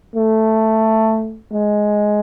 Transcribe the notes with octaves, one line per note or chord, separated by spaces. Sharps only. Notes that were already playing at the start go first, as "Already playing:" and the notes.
A3
G#3